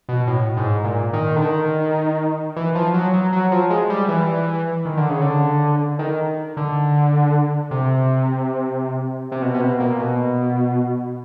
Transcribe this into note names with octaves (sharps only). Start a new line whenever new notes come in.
B2
A2
G#2
A#2
D#3
D3
D#3
E3
F3
F#3
F#3
F#3
F3
G#3
G3
E3
D#3
D3
C#3
D3
D#3
D3
C3
C3
B2
C3
B2
A#2
B2